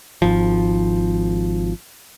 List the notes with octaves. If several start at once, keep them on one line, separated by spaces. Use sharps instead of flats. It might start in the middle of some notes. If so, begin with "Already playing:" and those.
G#1 F3